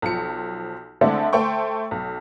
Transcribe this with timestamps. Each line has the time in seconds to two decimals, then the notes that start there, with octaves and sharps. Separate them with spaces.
0.02 B1 F3 C#7
1.01 D3 G#3 A3 C4 D4 E4
1.33 A3 C5 G5 C#6
1.91 B1